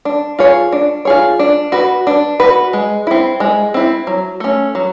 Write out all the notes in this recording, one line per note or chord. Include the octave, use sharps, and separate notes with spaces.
D4
F4 G#4 C#5
D4
F4 G#4 C#5
D4
F#4 B4
D4
F#4 B4
G#3
C4 E4
G#3
C4 E4
F#3
A3 C#4
F#3